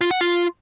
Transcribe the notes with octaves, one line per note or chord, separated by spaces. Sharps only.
F4
F#5
F4